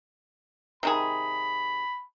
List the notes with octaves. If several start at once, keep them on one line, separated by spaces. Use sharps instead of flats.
C3 D#3 G#4 B5